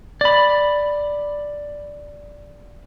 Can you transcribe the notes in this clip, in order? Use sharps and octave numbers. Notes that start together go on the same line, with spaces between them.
D5 B5